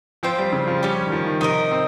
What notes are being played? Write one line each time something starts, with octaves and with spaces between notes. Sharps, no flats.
F3 C4 F4 C5 G5
G3
C#3
F3
G3 C#4 G4 C#5
D#3
F3
D#3
C3 D#4 A#4 D#5
C4